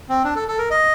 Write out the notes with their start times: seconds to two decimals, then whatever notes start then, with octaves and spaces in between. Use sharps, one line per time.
0.09 C4
0.24 D4
0.36 A4
0.48 A4
0.58 A#4
0.70 D#5